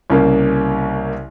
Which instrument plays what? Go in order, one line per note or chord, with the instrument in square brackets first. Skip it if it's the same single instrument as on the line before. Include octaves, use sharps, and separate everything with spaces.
[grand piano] C2 C#3 A#3